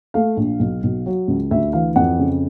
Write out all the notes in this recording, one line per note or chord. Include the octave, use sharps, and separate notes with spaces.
A3 F5
A#1
B1
B1
F#3
C#2
D2 E5
E3 F5
F2 F#5
C#3